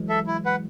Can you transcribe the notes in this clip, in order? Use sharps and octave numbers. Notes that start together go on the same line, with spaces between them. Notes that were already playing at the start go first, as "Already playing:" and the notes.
Already playing: E3 F#3 G#3
A4 E5
E4
B4 F#5